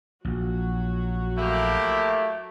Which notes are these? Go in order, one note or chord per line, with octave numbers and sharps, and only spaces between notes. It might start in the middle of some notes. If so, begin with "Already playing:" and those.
A#1 F#3 F#4
A3 A#3 E4 G4